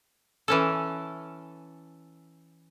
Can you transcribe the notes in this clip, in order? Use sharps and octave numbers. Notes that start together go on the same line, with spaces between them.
E3 C#4 A4